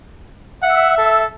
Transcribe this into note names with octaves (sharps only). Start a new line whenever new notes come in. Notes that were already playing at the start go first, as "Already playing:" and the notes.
E5 F#5
A4